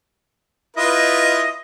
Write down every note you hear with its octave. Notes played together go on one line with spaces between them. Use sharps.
E4 F4 B4 D#5